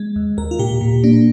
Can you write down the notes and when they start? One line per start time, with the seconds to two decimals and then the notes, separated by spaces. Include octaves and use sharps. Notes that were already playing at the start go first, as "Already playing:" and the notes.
Already playing: G#3
0.16 D#2
0.38 D#2 A#4
0.51 F4
0.59 A#2 G4
0.81 A#2
1.04 A#3 D4